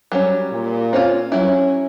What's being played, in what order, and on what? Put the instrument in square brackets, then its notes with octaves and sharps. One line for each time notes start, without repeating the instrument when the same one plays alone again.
[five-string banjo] F#3 G3 C#4
[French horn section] A#2
[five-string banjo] C4 C#4 F4
[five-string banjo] F#3 E4 [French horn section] C#4